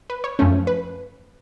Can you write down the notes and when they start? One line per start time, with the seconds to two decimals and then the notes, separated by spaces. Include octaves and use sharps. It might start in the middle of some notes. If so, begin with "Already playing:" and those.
0.10 B4
0.24 C#5
0.39 F#2 F3 A3 C#4
0.67 B4